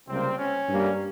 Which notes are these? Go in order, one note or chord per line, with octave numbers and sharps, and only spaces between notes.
C#2 C3 G3 A#3 C4
C#4
G2 G3 A#3